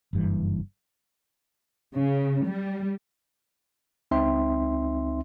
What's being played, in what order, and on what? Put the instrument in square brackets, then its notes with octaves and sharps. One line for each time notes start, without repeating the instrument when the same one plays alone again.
[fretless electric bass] F#1 G2 E3
[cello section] C#3
G3
[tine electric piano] C#2 C4 D#4 E5 C6